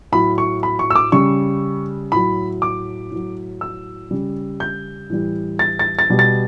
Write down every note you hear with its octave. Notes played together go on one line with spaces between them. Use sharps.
A2 F#3 B5
C#6
B5
C#6
E6
D6
C#3 G3 C#6
A2 F#3 B5
D6
A2 F#3
E6
C#3 G3
G6
A2 E3 G3
A6
A6
A6
B2 G3
A6